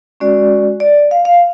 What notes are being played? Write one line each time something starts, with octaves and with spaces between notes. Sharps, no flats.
G#3 C#4 F#4 D5
D5
F5
F5